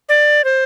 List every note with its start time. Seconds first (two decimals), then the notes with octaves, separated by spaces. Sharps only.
0.09 D5
0.44 C5